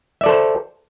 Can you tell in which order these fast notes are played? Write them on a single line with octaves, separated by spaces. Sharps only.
E5 D5 A4 C5